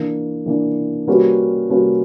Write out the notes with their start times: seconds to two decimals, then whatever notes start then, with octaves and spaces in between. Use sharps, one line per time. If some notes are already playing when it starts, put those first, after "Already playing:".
Already playing: E3 A#3 D4
0.46 E3 A#3 D4
1.08 G3 A#3 C#4 F#4 B4
1.69 G3 A#3 C#4 F#4 B4